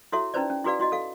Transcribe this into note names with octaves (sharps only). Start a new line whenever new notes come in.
E4 F#4 A4 C#5 E5
C#4 D#4 E4 B4 C5 D5
C#4
E4 F#4 G#4 B4 D5 F5
E4 F#4 D#5
A4 F5